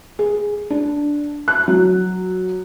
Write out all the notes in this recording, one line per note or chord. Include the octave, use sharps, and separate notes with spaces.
G#4
D4
F#6
F#3